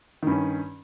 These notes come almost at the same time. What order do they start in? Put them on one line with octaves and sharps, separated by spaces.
D#3 G2 C#4